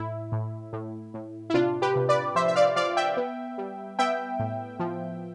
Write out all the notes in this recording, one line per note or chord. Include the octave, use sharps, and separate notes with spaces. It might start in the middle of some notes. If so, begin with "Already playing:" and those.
Already playing: A2 E4
A2
A2
A2
E4
C3 D4 F4
G4 B4
C3
B4 D5
F3 C5 E5
E5
D5 F5
F3 D5 F5
E5 G5
B3
G3
B3 E5 G5
A2
F3